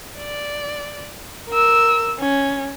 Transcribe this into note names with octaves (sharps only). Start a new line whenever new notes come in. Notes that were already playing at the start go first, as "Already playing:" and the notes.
D5
A#4 E6
C#4